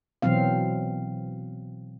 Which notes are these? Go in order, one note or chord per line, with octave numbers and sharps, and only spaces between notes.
B2 E3 F#3 C4 F5